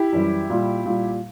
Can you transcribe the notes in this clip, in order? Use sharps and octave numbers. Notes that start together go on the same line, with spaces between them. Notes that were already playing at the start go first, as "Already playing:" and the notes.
Already playing: E4 G4
F#2 E3 G3
A#2 G3
A#2 G3